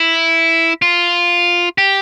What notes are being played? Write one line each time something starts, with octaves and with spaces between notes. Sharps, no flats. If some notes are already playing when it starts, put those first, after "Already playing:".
Already playing: E4
F4
G4